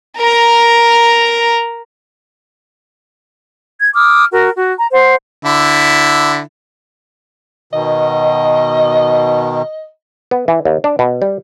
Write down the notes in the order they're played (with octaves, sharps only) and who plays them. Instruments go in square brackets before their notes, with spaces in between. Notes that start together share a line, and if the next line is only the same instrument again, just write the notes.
[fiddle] A#4 A#5
[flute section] G#6
D6 D#6 F6
F#4 A#4
F#4
A#5
C5 F#5
[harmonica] D3 E4
[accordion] B2 D#3 [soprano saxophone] D#5
[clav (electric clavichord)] B3
E3
D#2
D4
B2
G3